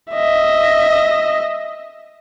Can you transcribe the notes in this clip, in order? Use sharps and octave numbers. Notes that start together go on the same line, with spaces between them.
D#5 E5